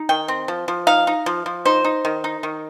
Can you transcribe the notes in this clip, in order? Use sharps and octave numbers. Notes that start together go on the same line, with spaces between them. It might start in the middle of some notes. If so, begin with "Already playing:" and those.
Already playing: D#4
D#3 G5
C4
F3
F3
D#4 F5
D#4
F3
F3
D#4 C5
D#4
D#3
D#4
D#3